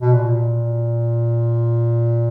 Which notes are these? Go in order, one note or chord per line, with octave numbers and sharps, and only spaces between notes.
B2
A#2